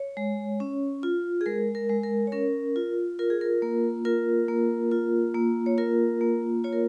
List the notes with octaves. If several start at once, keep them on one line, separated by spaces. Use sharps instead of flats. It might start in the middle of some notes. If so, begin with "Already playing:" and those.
Already playing: C#5
G#3
C#4
F4
G#4
G#3 A#4
A#4
G#3
A#4
C#5
C#4 A#4
F4
F4 A#4
G#4
A#4
A#3
F4 A#4
A#3
F4
A#3
C#5
F4 A#4
A#3
F4 C#5
A#4